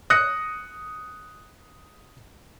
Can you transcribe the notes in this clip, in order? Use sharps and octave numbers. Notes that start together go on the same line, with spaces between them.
D#6 F#6 A#6 C#7